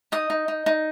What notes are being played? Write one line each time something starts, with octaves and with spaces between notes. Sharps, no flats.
D#4 D#6
D#4
D#4
D#4